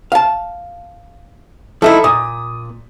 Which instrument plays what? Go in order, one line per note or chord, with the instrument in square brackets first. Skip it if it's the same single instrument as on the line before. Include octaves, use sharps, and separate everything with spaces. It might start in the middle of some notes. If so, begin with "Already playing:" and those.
[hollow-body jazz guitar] F5 A5
[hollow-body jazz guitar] F3 D#4 E4 [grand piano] A4 E5
[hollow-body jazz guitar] A#2 [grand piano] D#6